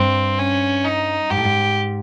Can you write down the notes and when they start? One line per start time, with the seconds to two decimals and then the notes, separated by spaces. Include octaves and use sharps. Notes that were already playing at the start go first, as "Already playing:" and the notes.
Already playing: G2 C4
0.38 C#4
0.85 D#4
1.30 G#2 G4
1.37 A2
1.44 G#2